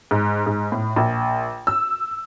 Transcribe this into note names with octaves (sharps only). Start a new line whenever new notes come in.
G#2
G#2
A2
A#1
E6